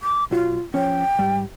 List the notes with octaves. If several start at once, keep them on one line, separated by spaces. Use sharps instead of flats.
D6
B1 F4 F#4
F3 C#4 G5
G#2 G3